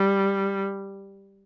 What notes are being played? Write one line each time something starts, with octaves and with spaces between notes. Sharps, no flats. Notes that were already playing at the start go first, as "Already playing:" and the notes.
Already playing: G3